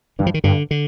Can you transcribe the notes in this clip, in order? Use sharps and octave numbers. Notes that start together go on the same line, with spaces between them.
G2 D#3
F3
D#3
G2 D3
D3